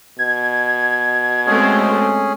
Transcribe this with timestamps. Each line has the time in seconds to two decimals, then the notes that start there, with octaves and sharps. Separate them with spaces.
0.19 B2 G#6
1.46 G#3 A3 C4 C#4 G#4